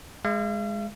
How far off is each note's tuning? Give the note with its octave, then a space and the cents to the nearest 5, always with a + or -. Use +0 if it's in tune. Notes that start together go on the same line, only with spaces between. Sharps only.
G#3 +0 F5 -45